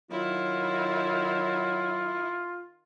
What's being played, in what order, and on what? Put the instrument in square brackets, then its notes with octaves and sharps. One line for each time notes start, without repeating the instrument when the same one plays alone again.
[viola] D#3 [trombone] F#3 [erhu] E4 [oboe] F4